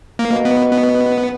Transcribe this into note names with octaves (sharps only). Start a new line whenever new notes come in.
A#3
B2
B3
B3